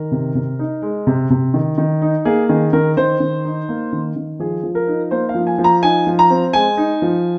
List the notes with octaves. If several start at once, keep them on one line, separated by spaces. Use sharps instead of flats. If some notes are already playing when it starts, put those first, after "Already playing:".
Already playing: D#3 A#4
C3
C3
D#4
G#3
C3
C3
D#3
D#3
D#4
A#3 G#4
D#3 G#4
D#3 A#4
D#3 C5
D#3
D#4
A#3
D#3
D#3
F3 G#4
F3
A#4
D#4
A#3 C5
F5
F3
G#5
F3
A#5
D#4 G#5
F3
A#5
C4
G#3 G#5
D#4
F3